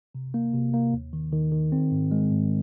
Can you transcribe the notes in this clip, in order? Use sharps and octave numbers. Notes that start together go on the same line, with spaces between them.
C3
A#3
C3
A#3
D#2
D#3
D#3
D#3
C4
G#2
G#3
G#2